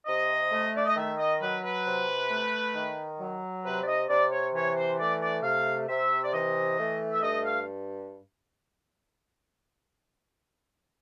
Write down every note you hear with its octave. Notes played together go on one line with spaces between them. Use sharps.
C3 D#5
A3
D5
D#5
D#3 E5
D#5
F#3 B4
B4
C3
A3
D#3
F#3
C3 B4
D5
D#5
C3 D5
C#5
E3 C#5
C5
A3 D5
D5
C3 F5
C3 E5
D5
E3 D#5
A3
E5
G2 D#5
F5